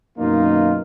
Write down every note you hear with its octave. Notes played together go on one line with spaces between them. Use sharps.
F#2 B2 D#3 A#3 D#4 F4